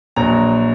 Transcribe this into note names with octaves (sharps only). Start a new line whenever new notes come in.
A#1 A#2 F#3 A#5